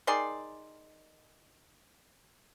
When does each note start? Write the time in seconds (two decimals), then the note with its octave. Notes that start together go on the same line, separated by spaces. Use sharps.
0.07 D#3 G#4 D5 C6